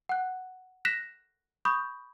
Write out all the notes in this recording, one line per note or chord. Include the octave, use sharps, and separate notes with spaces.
F#5 F#6
F#6 A#6 B6 E7
B5 C#6 D#6 G6